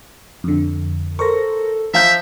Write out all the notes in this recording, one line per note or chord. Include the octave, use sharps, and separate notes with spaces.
F2 D3
A4 A#4 C5 C#6 A#6
F3 E5 F5 A#5 G6